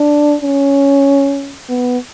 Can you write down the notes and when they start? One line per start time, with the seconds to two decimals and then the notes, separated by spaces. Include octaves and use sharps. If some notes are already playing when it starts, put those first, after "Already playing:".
Already playing: D4
0.42 C#4
1.69 B3